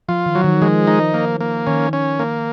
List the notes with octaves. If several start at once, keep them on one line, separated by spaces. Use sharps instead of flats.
F3 F4
D#3
F#3
D#3
F3 G#3
D#4
A#3
A#3
D#3 C#4
C#4
A#3